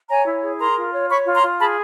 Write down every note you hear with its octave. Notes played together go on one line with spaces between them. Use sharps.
C#5 G#5 A#5
E4
G#4
A#4 A#5 C6
F4
C#5
C#5 B5 C#6
F4
A#5 C6
F4
G#4 A5 B5